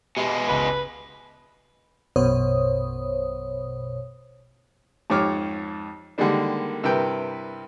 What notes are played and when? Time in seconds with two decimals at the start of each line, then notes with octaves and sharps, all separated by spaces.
0.17 B2 G#3 G4 E5
0.48 G1 C#2 C#3 B4
2.16 A#1 F#2 B2 C5 C#5 D#6
5.10 F2 G#2 G4 C#5 D6 F6
6.18 D3 D#3 G3 G#3 A#3 D4
6.83 G2 C3 E4 A#4 B4 G5